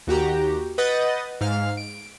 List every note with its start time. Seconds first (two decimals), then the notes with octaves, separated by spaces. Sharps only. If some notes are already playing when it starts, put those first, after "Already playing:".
0.07 D#2 F#4 G4 A#5
0.78 B4 D#5 F#5 D#6 G6 A6
1.41 G#2 F5 F6
1.77 D7